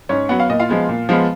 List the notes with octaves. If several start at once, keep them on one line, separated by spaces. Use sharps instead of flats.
G#2 C#4 C#5
F#3 B3 F#5
F5
A#2 D#5
F4 F5
F3 G#3 B3
A#2
F3 G#3 B3